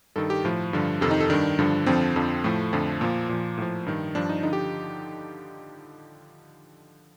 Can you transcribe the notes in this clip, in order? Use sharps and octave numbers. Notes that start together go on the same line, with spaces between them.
G2 D#3 A4
G4
A2 F3
G2 D3 F3
F2 C3 D#3 A4
D#4
A4
G2 D#3 D4
G2 D3 F3
F2 D3 F3 C4
F2 D3 F3
A2 F3 A3
F2 D3 F3
A#2 F3 A#3
A#2 F3
A2 F3
G2 D#3
G2 F3 D4
D#4
D3 F3 D#4
G4